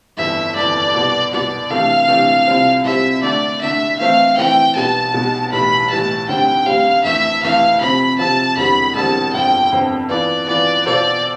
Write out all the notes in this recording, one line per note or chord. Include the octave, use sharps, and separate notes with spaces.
G1 F2 E3 E5
G1 F2 E3 D5
C2 B2 B3
C2 B2 B3 D5
C3 E3 A3 D4 A4 F5
C3 E3 A3 D4 A4
C2 C3 G3 C4 F4
C2 C3 G3 C4 F4 E5
D3 A3 D4 D5
D3 A3 D4 E5
E3 A3 C4 E4 F5
E3 A3 C4 E4 G5
B1 B2 G3 B3 A5
B1 B2 G3 B3
B1 A2 E3 G3 B5
B1 A2 E3 G3 A5
D2 D3 G3 C4 G5
D2 D3 G3 C4 F5
F2 E3 A3 E5
F2 E3 A3 F5
C3 F3 C4 B5
C3 F3 C4 A5
E1 E2 D3 G3 C4 B5
E1 E2 D3 G3 C4 A5
G1 F2 D3 F3 C4 G5
G1 F2 D3 F3 C4
E3 B3 F4 B4 D5
E3 B3 F4 B4 D5
B2 B3 F4 A4 C5 D5